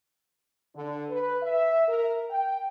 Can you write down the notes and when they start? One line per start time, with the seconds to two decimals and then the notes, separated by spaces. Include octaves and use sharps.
0.75 D3
1.09 B4
1.42 E5
1.87 A#4
2.30 G5